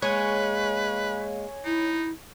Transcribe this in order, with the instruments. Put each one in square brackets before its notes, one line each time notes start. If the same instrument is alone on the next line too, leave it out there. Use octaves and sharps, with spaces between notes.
[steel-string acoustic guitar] G#3 [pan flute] A#3 [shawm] B4 [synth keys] C#5 G#5
[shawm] D#4 [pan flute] E4